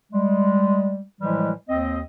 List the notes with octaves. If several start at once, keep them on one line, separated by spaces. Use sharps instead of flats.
G3 G#3
A2 E3 F3 G3 G#3
D#2 C4 D#5